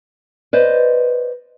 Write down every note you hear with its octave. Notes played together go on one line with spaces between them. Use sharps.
B4 C5 D5 D#5